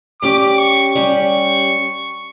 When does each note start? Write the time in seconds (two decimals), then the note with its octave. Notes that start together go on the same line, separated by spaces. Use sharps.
0.22 G3 C#4 G4 D5 D6
0.58 C#6
0.95 G3 C#4 G4 D5